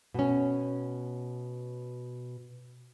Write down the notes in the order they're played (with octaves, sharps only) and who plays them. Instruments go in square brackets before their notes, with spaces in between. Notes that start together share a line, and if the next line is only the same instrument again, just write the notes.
[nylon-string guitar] B2 C#4